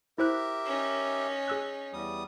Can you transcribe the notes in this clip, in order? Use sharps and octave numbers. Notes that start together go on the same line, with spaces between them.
E4 G4 A#4 C5 E5 F#6
C#4 D#4
G#4 E6 F#6
E2 G3 D#6